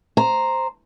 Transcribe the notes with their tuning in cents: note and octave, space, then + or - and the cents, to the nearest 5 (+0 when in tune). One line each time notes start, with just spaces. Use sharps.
C5 +0 A#5 +0